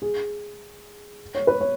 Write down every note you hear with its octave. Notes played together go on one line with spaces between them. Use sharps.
G#4
C#5
B4
C#5